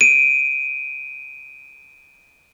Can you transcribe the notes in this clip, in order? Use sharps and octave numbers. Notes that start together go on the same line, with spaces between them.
D7 D#7